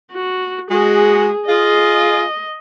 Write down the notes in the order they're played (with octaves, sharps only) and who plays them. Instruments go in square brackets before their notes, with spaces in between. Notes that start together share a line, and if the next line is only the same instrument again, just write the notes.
[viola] F#4
[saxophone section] G#3 F#4 [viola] G#4
[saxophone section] F4 G#4 [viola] D#5